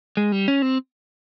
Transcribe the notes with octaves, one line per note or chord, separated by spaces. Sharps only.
G#3
G3
C#4
C4